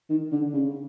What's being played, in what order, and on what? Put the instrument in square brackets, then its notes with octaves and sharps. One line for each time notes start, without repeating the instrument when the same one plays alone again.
[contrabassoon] D#3
D3
C#3